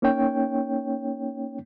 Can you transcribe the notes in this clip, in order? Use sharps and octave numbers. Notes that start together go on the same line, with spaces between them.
A#3 C#4 D#4 C#5 G5